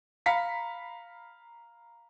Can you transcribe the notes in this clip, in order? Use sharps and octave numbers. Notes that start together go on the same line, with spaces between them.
F5 A#5 B5 B6 C#7